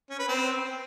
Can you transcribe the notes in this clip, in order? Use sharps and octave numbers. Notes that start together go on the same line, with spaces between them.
C#4
B4
C4